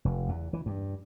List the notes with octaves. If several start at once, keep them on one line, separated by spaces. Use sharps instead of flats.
F1
E2
E3
G2